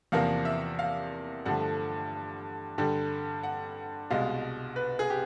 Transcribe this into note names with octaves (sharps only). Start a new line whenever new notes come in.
E2 C3 F3 A#3 F5
E5
F5
G2 D3 F3 A3 F#5
G2 D3 G3
F#5
C2 B2 G#3 F5
B4
G#4
G4